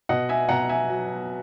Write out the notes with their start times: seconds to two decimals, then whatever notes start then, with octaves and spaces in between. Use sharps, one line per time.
0.09 B2 D#5 F#5
0.29 E5 G#5
0.49 B2 F#5 A#5
0.69 E5 G#5
0.90 F#3